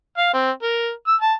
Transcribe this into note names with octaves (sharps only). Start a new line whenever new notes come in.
F5
C4
A#4
E6
A5